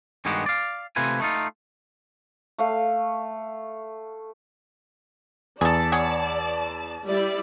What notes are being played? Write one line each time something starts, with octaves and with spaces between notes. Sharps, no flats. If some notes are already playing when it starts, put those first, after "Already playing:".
G2 D#3 G#3 B3 F#4 G4
D5 F5
C3 A3 F4 B4 G#5
A3 D#4 F4
A3 F5
E2 G#4 A4 D5 A5
B3 G#4 C#5
G3 E4 D5